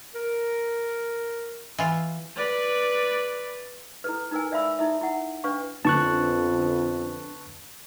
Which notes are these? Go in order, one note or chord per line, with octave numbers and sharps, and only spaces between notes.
A#4
E3 F4
B4 D5
E4 A4 B4
D#4 E4 A#4 B4 G#5
D5 E5 F5 B5 E6
D#4 E4 A4 E5
E4 F#5
D4 B4 F5 C#6
F2 D3 B3 C#4 A5 C#6 F#6